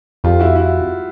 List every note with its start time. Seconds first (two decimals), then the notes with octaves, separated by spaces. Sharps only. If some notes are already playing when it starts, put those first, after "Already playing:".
0.24 F2 F4 G4
0.39 E4 F#4
0.55 E4 F#4